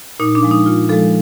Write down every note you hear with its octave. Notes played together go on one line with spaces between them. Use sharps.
A#2 D#4
D4
F3 G#3
D#4
A#2 F4
F3 G#3 A4